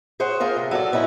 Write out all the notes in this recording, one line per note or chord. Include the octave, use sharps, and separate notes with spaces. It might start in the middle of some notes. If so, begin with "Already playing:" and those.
G#4 C5 C#5 F#5
F4 G#4 A#4 F5
C3
F#3 A4 C#5 D5
B3 C#4 D#4 E4 A#4